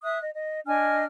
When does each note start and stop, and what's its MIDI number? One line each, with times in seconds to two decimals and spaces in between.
0.04 0.18 76
0.04 0.18 87
0.04 0.18 90
0.21 0.30 75
0.35 0.59 75
0.66 1.04 62
0.66 1.04 75
0.66 1.04 80
0.66 1.04 89